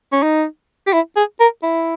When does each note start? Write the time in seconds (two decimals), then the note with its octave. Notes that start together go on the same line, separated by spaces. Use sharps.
0.12 C#4
0.23 D#4
0.87 G4
0.93 E4
1.16 G#4
1.40 A#4
1.63 E4